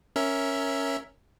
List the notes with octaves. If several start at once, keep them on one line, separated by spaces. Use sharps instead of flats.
C#4 A#4 E5